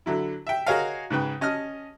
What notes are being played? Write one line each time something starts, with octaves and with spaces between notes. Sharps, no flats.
D3 F#3 E4
E5 G5
F#4 G#4 A#4 C#5 D#5 F5
G#2 C#3 B4 G5
C#4 D#5 A5 D#6 F6